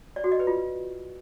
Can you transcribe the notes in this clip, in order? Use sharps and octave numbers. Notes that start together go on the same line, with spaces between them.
D5
F#4
D#5
B4
F4